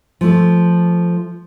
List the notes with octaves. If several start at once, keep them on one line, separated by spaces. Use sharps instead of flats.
F3 A3